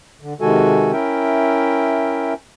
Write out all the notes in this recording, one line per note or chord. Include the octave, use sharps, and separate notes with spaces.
D3
C3 D#3 G#3 F#4 A4 G#5
C#4 E4 A#4 E5 G5